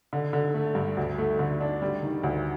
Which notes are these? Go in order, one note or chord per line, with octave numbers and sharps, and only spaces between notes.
D3
D3
A3
G2
D2
A3
D3
D4
G3
D#3
D2